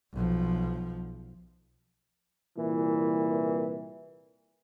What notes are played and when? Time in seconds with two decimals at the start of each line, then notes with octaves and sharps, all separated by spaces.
0.13 B1 F3
2.59 C2 A#2 E3